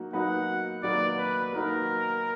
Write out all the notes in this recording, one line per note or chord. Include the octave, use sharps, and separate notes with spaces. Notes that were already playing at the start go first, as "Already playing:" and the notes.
Already playing: F#3 A#3 D#4 F#4
F#3 A#3 D#4 F#4 B4 F#5
F#3 A#3 D#4 F#4 B4 D5
B4
F#3 A#3 D#4 F#4 A#4 B4